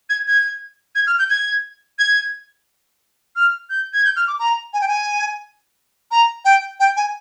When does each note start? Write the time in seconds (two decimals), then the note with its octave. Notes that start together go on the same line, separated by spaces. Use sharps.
0.10 G#6
0.27 G#6
0.95 G#6
1.07 F6
1.19 G6
1.30 G#6
1.99 G#6
3.36 F6
3.70 G6
3.94 G#6
4.05 G6
4.16 F6
4.27 D6
4.39 A#5
4.73 G#5
4.81 G5
4.88 G#5
6.11 A#5
6.45 G5
6.80 G5
6.97 G#5